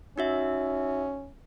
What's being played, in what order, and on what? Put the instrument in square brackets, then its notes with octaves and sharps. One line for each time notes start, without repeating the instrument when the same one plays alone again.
[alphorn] C#4 [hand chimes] D#4 F#4 E5